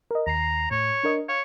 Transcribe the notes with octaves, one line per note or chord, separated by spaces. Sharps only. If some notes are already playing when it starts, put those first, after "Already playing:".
A#4 D#5
D#2 A#5 C7
A2 C#5
D4 A#4 D#5
C#5 F5